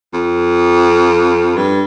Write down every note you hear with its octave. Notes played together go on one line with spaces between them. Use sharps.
F2
G2